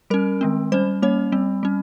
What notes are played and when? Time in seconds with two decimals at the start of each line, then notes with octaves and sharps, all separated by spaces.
0.10 G3 C#4 A#4
0.41 D#3 G#3 C4
0.72 G3 C#4 C5
1.02 G3 A#3 C#4 C#5
1.32 G3 C4
1.63 G3 C#4